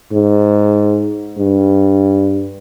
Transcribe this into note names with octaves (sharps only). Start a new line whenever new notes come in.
G#2
G2